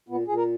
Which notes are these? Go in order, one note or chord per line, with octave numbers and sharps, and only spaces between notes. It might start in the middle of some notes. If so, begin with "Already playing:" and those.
A#2 B3
A#2 G#4
A#4